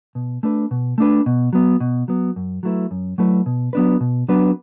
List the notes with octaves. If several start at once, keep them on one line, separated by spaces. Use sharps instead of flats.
B2
A3 D4 B4
B2
A3 D4 B4
B2
F#3 B3
B2
F#3 B3
F#2
F#3 A3 E4 B4
F#2
F#3 A3 E4 B4
B2
F#3 B3 D4 B4
B2
F#3 B3 D4 B4